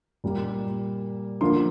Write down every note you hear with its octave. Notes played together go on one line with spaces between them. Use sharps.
A#2 G3 A#3
D3 F3 A#3 F4 C6